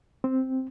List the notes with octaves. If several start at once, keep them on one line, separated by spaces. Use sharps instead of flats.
C4